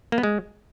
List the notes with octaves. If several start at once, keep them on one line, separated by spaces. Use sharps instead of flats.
A#3
B3
G#3